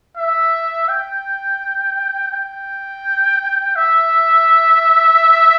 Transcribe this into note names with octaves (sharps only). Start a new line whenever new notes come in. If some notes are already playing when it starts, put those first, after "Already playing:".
E5
G5
G5
E5